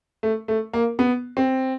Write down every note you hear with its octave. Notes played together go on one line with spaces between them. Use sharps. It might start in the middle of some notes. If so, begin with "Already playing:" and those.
A3
A3
A#3
B3
C4